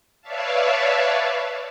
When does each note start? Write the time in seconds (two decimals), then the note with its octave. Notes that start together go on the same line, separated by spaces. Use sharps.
0.21 B4 C#5 D5 E5 F5 A5